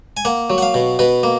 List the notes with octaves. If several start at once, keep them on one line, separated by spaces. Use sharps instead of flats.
G#5
A#3 F#5
F#3
F#5
F5
B2
B2 B4
A#3